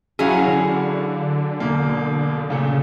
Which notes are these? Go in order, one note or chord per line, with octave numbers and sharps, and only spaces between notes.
F#3 C#4 E4 F#4 G#4 F5
D3
E1 A#3
A#2 C#3 A3